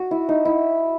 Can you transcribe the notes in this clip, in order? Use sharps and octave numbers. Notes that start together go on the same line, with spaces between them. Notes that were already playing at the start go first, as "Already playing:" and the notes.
Already playing: F#4
E4
D#4
E4